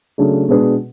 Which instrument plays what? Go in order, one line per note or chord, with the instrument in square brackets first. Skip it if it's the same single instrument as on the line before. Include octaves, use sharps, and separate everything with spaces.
[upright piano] C#3 F#3 A3 D4 G#4
B2 G#3 D4 G#4 B4